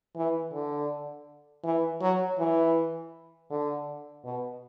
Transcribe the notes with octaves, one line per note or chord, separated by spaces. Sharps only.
E3
D3
E3
F#3
E3
D3
B2